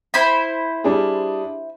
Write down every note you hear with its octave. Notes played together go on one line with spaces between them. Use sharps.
E4 C5 B5
G3 D4 G#4